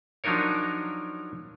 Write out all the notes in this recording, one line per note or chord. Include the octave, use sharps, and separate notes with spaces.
F3 F#3 D4 D#4 A#4 C#5